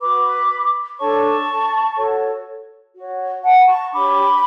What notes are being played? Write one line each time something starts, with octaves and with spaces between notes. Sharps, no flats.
F#4 B4 B5 D6
D4 A4 C#5 A5 C#6
F#4 A4 C#5
F#4 C#5
F#5 A5
B5
A5 C#6
D4 G4 C#5 B5 D6